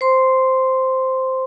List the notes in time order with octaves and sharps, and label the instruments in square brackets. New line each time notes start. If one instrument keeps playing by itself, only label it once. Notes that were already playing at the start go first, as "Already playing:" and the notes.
[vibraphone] C5 C6